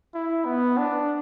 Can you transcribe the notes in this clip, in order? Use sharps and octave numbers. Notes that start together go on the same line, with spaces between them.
E4
B3
D4